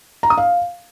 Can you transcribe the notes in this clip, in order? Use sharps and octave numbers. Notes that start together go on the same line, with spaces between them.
A#5
D#6
F5